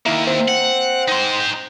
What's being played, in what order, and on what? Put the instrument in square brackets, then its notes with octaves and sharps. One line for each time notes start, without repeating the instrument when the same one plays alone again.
[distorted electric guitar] D#3 A#3 [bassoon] E4
[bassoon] C4
[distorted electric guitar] F#5
D#4 C5